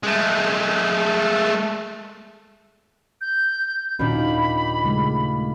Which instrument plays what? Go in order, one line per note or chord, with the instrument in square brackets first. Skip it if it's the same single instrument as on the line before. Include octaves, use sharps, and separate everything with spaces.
[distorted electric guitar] G#3 A3
[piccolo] G6
[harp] D#2 A#2 [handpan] C#4 D4 F#4 [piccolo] B5
[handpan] C#3 G#3 A3